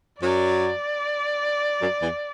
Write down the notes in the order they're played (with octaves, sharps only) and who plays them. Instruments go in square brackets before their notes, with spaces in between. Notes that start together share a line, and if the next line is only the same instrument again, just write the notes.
[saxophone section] F#2 F#3 [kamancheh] D5
[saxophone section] F#2 F#3
E2 E3